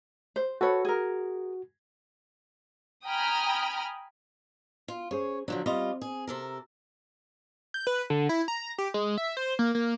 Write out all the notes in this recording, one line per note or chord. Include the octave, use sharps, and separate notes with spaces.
C5
F#4 A4 B4 C#5
G#4 A#4
G5 G#5 A#5 B5 D#6 F6
F4
C#4 G#4 C5 C#5
D3 F3 F#3 D4
G3 C4 F4 D#5
G#4
C3 A4 A#4
G6
B4
D3
E4
A#5
G4
G#3
E5
C5
A#3
A#3